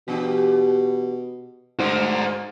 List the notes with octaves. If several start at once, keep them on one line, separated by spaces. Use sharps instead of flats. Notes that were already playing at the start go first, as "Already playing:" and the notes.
B2 E3 D4 G4
G#2 G3 D4 F#4 A#4 C5